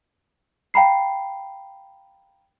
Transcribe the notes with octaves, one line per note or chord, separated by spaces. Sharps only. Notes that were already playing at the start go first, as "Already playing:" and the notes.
F5 G5 A#5 B5 C7